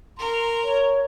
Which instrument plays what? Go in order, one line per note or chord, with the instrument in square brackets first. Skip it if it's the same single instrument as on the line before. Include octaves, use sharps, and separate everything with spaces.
[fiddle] A#4 A#5 [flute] C6
[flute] C#5